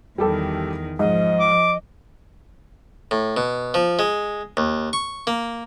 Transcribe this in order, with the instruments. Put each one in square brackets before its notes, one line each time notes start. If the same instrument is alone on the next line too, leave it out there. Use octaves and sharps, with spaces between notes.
[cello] E2 D#3 [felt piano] G3 G4 A4
[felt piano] G#2 [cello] F3 [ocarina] D#5
[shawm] D6
[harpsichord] A2
B2
F3
G#3
D#2
C#6
A#3